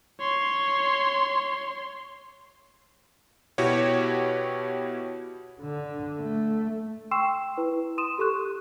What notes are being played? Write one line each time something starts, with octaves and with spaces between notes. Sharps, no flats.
C#5 C6
B2 E4 F#4 G4 C#5
D3
A3
G5 C6 C#6 E6 C7 E7
E4 B4
C6 D#6 D#7 E7
G4 A4 C6 C#6 F#6